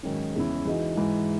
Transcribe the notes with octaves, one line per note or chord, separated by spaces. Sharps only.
G#2 D#3 F#3 C#4
E2 C#3 G#3 C#4 E4
E3 G#3 D#4 F#4
G#2 E3 G#3